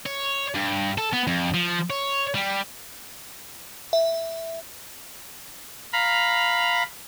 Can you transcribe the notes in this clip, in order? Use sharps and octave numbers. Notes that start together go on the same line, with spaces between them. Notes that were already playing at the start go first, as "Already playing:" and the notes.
C#5
G2
A4
B3
F2
F3
C#5
G3
E5
F5 A#5 B5